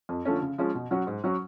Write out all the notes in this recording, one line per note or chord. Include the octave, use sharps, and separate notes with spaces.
F2
D3 F3 A3 C#4
C#3
F3 G#3 C#4
B2
F#3 C#4 F#4
G#2
F#3 C#4 F#4